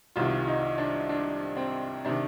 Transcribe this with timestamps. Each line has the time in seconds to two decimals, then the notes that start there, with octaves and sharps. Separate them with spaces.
0.16 C2 C3 D#3 F4
0.47 D#4
0.78 D4
1.09 D4
1.57 C4
2.04 C3 D#3 D4